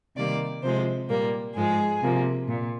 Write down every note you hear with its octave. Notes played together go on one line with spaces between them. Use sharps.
C3 D#3 G3 A#3 D5
C3 F3 G#3 C5
A#2 G3 A#3 A#4
G#2 F3 G#3 G#4
C3 F3 A#3
A#2